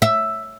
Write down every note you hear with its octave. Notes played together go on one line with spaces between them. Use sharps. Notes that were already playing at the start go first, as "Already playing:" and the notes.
E5